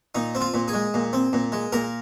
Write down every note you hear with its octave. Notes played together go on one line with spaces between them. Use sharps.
A#2 D#4
C4
F4
A#2
G#4
G#3
A#2
C4
A#2
G#3
A#2 A#4